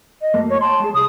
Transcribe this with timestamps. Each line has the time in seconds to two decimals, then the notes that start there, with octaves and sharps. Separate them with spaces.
0.21 D#5
0.34 F#2 A3 A#3
0.49 C#5
0.61 G5 A5 C6
0.80 G#3 G#4
0.94 C2 G#4 D#6